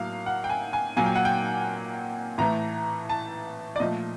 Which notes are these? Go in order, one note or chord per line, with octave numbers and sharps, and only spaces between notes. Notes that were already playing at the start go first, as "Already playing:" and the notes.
Already playing: A2 F#3 A#3 F5
F#5
G5
G#5
G#5
A#2 F#3 A#3 G#5
G5
F#5
G5
A2 E3 A3 A#5
A5
D5
A#2 F3 A3 D#5